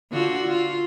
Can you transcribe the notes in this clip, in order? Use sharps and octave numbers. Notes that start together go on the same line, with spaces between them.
D3 F4 F#4
F4